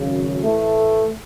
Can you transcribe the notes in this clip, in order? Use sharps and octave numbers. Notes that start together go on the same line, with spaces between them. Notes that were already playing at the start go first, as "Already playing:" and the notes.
Already playing: G#1 F#2 C#3
A2 E3 A3